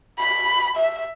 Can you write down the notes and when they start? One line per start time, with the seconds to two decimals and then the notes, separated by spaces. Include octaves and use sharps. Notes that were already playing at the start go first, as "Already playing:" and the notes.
0.19 B5
0.76 E5